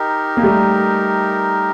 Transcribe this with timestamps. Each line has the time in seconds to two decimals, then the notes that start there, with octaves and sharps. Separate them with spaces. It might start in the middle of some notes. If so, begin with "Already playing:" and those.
Already playing: D#4 G4 A#4
0.37 A#3
0.43 G3 A3